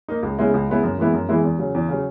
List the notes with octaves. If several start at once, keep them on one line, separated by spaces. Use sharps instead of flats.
A#3 D#4
C#2
C#3 G#3 B3 E4
C#2
C#3 G#3 B3 E4
F#2
E3 G#3 B3 E4
F#2
E3 G#3 B3 E4
E2
C#3 F#3
E2
C#3 F#3